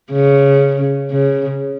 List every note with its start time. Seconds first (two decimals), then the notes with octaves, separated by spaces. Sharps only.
0.12 C#3
1.12 C#3